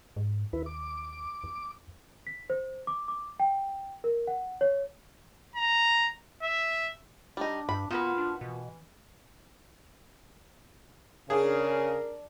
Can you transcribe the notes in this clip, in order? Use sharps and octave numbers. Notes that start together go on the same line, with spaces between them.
G#2
D#2 E4 B4
D6
E2
B6
C5
D6
D6
G5
A#4
F#5
C#5
A#5
E5
G3 D4 D#4
G2 B5
A#2 B3 F4 F#4 B4
D4
B2 E3
C#3 D4 G#4 A#4